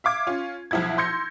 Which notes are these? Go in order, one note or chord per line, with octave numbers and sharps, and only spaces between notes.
E5 F5 D6 G#6
C#4 F4
B1 F3 E4 F#5 G#6
C6 E6 G6 G#6 A#6 C#7